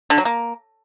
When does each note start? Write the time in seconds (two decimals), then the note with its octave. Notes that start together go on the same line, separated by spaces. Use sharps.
0.10 D3
0.18 F#3
0.25 A#3